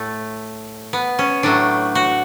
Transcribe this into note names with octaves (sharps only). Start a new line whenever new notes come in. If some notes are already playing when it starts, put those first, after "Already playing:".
Already playing: A2 A3
B3
C#4
A2 F#3 A3 D4
F#4